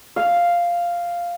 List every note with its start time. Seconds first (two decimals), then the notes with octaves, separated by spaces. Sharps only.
0.16 F5